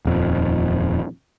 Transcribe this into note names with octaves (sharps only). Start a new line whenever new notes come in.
D#1 F2